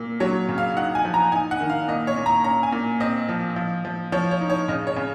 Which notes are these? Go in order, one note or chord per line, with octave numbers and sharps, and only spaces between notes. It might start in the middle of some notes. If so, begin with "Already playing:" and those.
Already playing: A#2
F#3 C#5
C#3
F5
D#4 F#5
G#5
F3
A#5
D#4 G#5
F#5
D#3
F5
A#2 D#5
C#5
A#2
A#5
C#4 A#5
G#5
A#2
C4 D#5
F3
F3
F3
F3 C#5
C#5
D#4
C#5
C#3 D#5
C#5
C#3